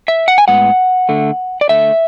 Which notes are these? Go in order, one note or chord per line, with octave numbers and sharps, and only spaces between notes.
E5
F#5
G#5
A2 G#3 B3 F#5
D3 A3
D5
D3 A3 E5